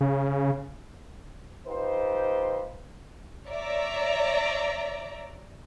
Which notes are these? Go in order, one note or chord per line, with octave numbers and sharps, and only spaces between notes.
C#3
D#4 F4 G4 B4 C5
C#5 D5 E5 A#5